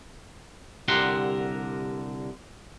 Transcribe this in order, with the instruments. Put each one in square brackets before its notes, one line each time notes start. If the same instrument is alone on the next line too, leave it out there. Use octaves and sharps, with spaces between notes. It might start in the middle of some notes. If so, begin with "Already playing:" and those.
[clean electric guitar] C2 D3 G4 A#4 F#5 C6